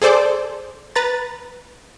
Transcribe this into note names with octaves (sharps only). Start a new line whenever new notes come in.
G#4 A4 C5 D5 D6
B4 A#5 A6